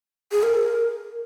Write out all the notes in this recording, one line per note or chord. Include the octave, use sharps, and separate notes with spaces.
G#4
A#4